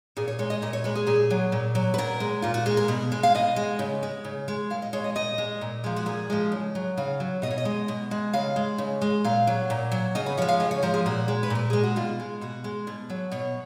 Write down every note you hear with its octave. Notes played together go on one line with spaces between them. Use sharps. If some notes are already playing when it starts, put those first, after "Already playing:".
A#2 G#4
C#5
G#3 C#5
D#5
A#2 D#5
C#5
G#3 B4
G#4
A#2 G#4
F#3
A#2
F#3
B4
A#2 A#4
G#3
A#2 F4
F#4
G#3 G#4
A#4
B2 B4
G#3
F5
B2 D#5
G#3
C#3
G#3
C#3
G#3
A#2 F5
D#5
G#3 C#5
D#5
A#2 D#5
G#3
A#2
F3 G#3
F#4
A#2 G#4
F3 G#3
C#3
F#3
C#3 F5
F#3
B2 D#5
C#5
D#5
G#3
B2
G#3
C#3 F5
G#3
C#3
G#3
A#2 F5
F#3
A#2
F#3
C#3 D#5
B4
F3 G#3 C#5
F5
C#3 D#5
C#5
F3 G#3 A#4
G#4
A#2 F#4
G#3
B4
A#2 A#4
G#3 G#4
F#4
B2 F4
G#3
B2 F#4
G#3
B2
F#3
B2 C#5